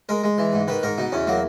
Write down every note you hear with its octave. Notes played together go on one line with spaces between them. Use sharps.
G#3 A#4
G#3
E3
G#2
D#3 B4
G#2 A#4
B2 D#4
E2 C#4
F#3 A#3